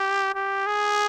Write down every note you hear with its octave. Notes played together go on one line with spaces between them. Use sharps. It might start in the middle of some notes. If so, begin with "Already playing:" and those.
Already playing: G4
G4
G#4